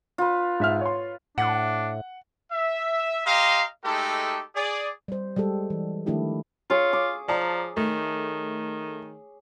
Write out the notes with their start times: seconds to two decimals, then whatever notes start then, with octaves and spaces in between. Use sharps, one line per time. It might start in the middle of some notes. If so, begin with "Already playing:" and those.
0.18 F4 B4
0.60 G#2 E5 F6
0.81 C#5 C6
1.38 A2 D4 F#5
2.51 E5
3.25 G4 D#5 F5 A#5 C6
3.84 G#3 A3 D#4 G4 A4
4.56 G#4 D5
5.08 G3 C5
5.36 G3 G#3 G4 A4
5.70 E3
6.06 D#3 F3 A3 D4 E4 G4
6.70 F4 G#4 C#5
6.93 D6
7.28 F3 D5 A5 A#5
7.77 D#3 A3